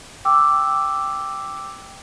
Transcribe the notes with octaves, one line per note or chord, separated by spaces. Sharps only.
G5 D6 E6